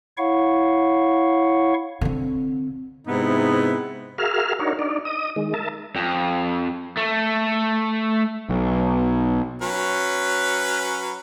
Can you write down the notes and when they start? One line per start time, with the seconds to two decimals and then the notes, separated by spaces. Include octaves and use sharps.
0.17 E4 C#5 F5 F#5 C#6
2.01 D3 C4
3.07 G#2 C3 B3 D#4 E4
4.18 F#4 G#4 A#4 E5 F5 F6
4.59 D4 D#4 F#4 A#4 C#5
4.79 D4 D#4 D5
5.05 D#5 D#6
5.36 D#3 G#3
5.54 A#4 E5 A5
5.96 F2
6.97 A3
8.49 B1
9.62 F#3 C#4 B4